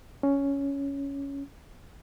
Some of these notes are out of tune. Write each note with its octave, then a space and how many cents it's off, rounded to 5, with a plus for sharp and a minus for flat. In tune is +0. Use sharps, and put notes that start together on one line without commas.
C#4 +10